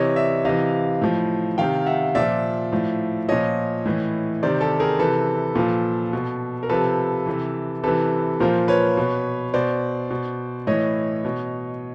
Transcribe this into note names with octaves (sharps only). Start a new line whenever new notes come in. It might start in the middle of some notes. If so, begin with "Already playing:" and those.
Already playing: C3 E3 C#5 D#5
D5 E5
C3 E3 D#5 F5
A2 F3
C3 D#3 F5 G5
E5 F#5
A#2 F3 D5 E5
A2 F3
A#2 F3 C#5 D#5
A2 E3
C3 D#3 C5 D5
G4 A4
G#4 A#4
C3 E3 A4 B4
A#2 F3
B2
A#4
C3 F3 A4 B4
C3 E3
C3 E3 A4 B4
A#2 F3 A#4 C5
B4 C#5
B2
B2 C5 D5
B2
A2 E3 C#5 D#5
B2